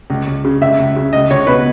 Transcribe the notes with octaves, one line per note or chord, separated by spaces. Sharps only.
C#2
C#2
C#3
C#2 E5
C#2
C#3
C#2 D#5
C#2 C#5
B2 B4